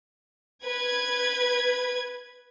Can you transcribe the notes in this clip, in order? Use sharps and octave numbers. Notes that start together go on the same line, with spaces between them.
B4 G#6